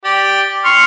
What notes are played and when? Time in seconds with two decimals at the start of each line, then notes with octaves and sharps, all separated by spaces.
0.04 G4 D5
0.65 C6 C#6 F6